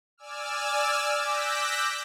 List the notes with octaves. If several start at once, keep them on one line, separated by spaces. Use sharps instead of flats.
D5 G#5 D6 E6 F6
D6 E6 F#6 G6 A#6 B6